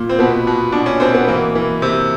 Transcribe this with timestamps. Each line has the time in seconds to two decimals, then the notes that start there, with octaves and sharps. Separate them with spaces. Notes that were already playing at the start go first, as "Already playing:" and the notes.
Already playing: A#2
0.09 C4
0.19 B2 B3
0.47 B2
0.72 B2 D4
0.86 C#4
1.00 B2 C4
1.14 B3
1.28 E3 A#3
1.55 E3
1.82 C3